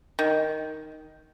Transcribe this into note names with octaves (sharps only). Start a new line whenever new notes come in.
D#3